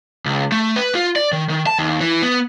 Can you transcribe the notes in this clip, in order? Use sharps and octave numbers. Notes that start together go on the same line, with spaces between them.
C#2
A3
B4
F4
D5
D#3
D#3
A5
D#2
E3
B3